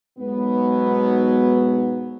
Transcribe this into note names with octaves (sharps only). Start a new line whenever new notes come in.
B1 G#2 B2 F#3 B3